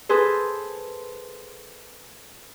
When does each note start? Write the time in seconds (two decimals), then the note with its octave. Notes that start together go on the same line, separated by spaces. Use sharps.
0.09 G#4 A4 B4 C5